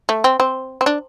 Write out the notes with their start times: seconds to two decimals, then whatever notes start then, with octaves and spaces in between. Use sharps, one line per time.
0.09 A3
0.24 C4
0.40 C4
0.81 C4
0.86 D4